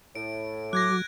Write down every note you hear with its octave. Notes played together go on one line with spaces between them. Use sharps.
A2 D7
F#3 D6 F#6 G#6 A#6